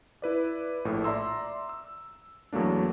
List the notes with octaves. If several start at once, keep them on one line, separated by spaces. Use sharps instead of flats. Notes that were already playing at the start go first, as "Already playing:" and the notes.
E4 B4 D5
A#1 A2
D5 E5 A#5 C6 E6
E6
E2 F#3 A3 A#3 D4